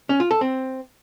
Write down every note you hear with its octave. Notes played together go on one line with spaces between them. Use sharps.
C#4
F4
A4
C4